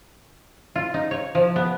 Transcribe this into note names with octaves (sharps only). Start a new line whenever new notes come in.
F4
D#4
C#5
F3
B3